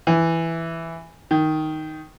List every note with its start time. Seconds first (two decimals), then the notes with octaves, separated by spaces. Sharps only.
0.07 E3
1.31 D#3